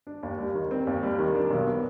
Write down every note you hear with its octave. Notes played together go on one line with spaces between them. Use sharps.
D4
D#2
G3
D#3
C4
D#2
G3
D#3
D4
B1
B3